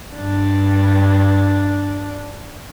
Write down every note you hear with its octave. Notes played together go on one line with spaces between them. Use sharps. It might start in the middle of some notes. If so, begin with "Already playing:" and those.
G2 D4